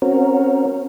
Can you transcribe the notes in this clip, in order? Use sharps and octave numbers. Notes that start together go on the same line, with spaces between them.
C4 C#4 F#4 A#4